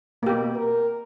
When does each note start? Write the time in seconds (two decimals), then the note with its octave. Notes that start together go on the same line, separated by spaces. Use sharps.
0.23 B2 A#3 G4
0.55 A#4